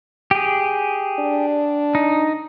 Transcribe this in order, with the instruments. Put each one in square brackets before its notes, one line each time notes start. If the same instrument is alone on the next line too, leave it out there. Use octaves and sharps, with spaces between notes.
[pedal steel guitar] G4 G#4
[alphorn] D4
[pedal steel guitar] D#4